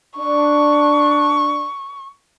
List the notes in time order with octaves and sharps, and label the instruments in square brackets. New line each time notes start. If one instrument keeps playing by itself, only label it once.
[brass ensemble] D4 [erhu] C#6